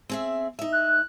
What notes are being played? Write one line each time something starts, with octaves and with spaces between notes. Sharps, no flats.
C4 G#4 E5
D#4 E5
F#6